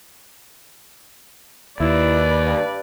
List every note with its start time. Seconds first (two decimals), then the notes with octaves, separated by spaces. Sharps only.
1.80 D#2 E4 B4 D5
2.44 G2